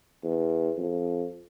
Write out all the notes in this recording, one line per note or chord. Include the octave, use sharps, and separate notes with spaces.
E2
F2